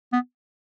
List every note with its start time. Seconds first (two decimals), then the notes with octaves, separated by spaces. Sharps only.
0.13 B3